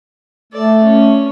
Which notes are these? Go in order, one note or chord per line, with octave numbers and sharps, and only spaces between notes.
A3 A4 D5
C#4